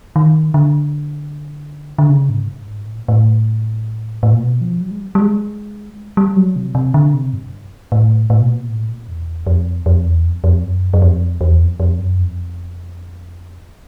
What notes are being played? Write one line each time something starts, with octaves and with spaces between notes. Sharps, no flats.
D#3
D3
D3
C#3
G#2
G2
G#2
A2
A#2
A2
A2
A#2
B2
F3
F#3
G#3
G3
G3
G#3
G3
F#3
C3
C3
D3
C3
G2
A2
A2
B2
A#2
A2
A#2
E2
F2
F2
E2
F2
F2
F#2
F#2
F2
E2
F2
F2
F#2
F2